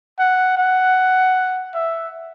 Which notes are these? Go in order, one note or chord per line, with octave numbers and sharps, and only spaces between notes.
F#5
F#5
E5